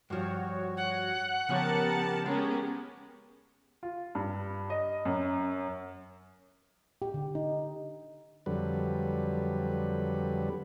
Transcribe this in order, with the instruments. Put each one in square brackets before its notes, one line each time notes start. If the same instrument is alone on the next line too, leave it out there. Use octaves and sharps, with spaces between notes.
[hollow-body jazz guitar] G2 F3 [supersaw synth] F#4 C#5
[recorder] F#5
[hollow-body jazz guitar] C#3 F3 C#5 [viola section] B3 A5 [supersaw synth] G4 A#4
[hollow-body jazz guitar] G#3 [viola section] B3 C#4 G#4
[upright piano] F4
G2
D#5
F#2
[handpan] G4
D3
D#4
[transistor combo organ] F2 D3 F#3 G3 B4